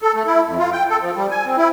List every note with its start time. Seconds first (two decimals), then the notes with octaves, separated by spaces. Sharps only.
0.02 A4
0.14 A3
0.26 E4
0.47 F2
0.58 F4
0.72 G5
0.89 A4
1.02 F3
1.16 G3
1.31 G#5
1.46 C4
1.57 E4